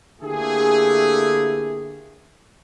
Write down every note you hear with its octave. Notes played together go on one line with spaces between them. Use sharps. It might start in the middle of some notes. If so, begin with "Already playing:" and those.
D3 A3 A#3 E4 G4 G#4